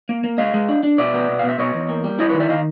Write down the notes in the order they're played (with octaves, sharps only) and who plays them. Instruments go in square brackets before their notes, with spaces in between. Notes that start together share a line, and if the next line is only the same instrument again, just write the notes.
[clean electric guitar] A#3
A#3
G#3 D#5 F5
G#3
D4
D4
B2 D5 E5
B3
B2
F5
B2
E5
B2 C#5 D#5
E2
A#3
G3
E4 C#5 D#5
B4 C#5
D#3
D5 E5
D#3 D#5 F5